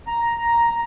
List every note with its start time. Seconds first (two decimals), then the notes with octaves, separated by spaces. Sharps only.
0.07 A#5